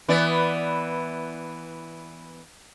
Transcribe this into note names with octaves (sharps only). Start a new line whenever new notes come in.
E3 B3 D5